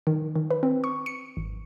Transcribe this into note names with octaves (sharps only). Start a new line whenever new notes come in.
D#3
D#3
B4
C4
C#6
C#7
G#1